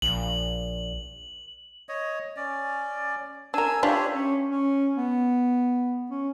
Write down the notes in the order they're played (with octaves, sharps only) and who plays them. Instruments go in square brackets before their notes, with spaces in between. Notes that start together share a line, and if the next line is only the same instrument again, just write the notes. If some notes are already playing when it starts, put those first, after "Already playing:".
[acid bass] A#1 [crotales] F#7
[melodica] C#5 D#5
C#4 D5
[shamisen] D4 A#4 [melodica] G#5 E6
[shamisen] D4 F4 [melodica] G4 C#5 E5
[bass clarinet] C#4
C#4
B3
C#4